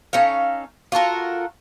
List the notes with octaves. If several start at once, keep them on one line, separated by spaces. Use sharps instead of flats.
C#4 D#4 A4 F5
F4 F#4 A4 A#4